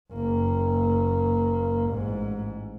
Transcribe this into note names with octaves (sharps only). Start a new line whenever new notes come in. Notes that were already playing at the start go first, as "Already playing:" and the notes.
F#1 A#3
A1 G#2